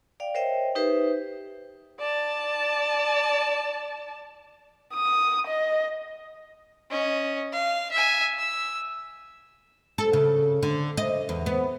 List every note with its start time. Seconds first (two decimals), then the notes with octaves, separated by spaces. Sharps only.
0.20 D5 F5 G5
0.35 A#4 C5 C#5 D#5 E5 G5
0.75 D#4 G4 B4 C5 E5
2.00 D5 A5
4.95 D#6
5.47 D#5
6.91 C#4 D#5
7.52 F5
7.91 E5 G#5
8.38 E6
9.98 A4
10.13 C#3
10.63 D3
10.97 D#5
11.29 E2
11.46 B3